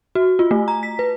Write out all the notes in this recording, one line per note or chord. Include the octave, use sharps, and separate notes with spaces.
F#4
F4
A3
A#5
B6
B4